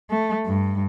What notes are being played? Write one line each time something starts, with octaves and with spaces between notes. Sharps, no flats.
A3
G2